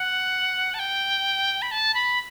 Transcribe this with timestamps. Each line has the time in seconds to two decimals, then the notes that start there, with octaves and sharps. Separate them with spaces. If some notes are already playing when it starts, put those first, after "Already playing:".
Already playing: F#5
0.74 A5
0.79 G5
1.62 B5
1.71 A5
1.94 B5